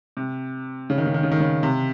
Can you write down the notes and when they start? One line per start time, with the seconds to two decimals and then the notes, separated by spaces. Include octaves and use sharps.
0.17 C3
0.90 C#3
0.98 D#3
1.06 C#3
1.14 D#3
1.23 C#3
1.32 D#3
1.40 C#3
1.63 C3